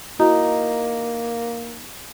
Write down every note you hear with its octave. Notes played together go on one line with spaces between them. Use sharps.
A#3 D#4 E4 F#4